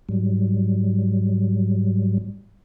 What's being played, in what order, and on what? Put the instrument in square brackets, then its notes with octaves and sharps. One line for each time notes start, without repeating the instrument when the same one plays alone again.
[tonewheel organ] G#2 F#3 G3